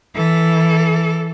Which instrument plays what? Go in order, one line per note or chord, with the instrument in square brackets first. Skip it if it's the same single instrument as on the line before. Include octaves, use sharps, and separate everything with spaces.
[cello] E3 A4